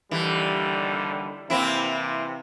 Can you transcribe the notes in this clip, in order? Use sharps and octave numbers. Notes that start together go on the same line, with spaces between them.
D#2 D3 E3 G3
C3 E3 A#3 C4 E4